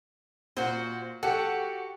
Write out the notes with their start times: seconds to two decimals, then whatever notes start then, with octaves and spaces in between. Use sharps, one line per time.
0.57 A#2 F#4 C5
1.23 F#4 G4 A4